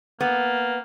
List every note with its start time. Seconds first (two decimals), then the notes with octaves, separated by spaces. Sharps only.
0.21 A#3 B3